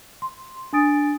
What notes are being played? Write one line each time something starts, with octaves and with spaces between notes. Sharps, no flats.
C6
D4 G#5 D#6 A6 D7